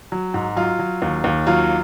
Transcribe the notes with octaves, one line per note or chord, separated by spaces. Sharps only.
F#3
G#2
F#3 F4
F#3
D#2
D#2
F#3 F4